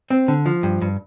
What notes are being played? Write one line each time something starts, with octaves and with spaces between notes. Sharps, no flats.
C4
D3
F3
G2
G2